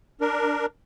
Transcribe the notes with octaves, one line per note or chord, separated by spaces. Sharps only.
D4 A#4